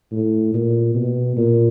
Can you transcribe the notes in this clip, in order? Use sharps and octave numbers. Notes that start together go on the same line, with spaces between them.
A2
A#2
B2
A#2